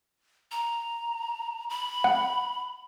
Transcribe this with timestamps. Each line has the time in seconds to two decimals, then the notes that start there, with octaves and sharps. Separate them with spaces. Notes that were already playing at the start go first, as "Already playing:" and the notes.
0.52 A#5
1.70 B5
2.04 F#5